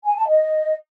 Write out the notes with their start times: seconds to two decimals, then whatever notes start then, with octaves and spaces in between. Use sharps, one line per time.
0.04 G#5
0.16 A5
0.27 D#5